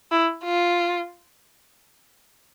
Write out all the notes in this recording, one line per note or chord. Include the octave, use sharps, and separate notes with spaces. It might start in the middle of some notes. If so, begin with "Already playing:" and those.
E4
F4